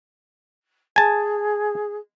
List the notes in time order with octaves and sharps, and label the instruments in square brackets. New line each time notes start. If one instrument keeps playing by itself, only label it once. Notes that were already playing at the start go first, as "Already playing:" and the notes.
[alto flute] G#4 [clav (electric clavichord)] G#5 A5